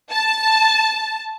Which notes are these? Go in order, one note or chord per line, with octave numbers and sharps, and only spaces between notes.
A5